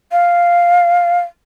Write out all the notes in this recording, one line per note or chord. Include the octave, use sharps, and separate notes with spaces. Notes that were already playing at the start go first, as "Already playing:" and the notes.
F5